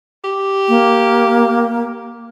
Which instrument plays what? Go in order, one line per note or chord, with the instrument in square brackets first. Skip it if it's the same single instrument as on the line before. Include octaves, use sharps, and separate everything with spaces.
[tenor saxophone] G4
[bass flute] A#3